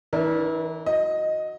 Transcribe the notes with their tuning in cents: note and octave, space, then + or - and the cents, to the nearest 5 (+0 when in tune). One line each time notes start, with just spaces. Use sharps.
E3 -35 D4 +0 A#4 +0
F#4 -15 D#5 +0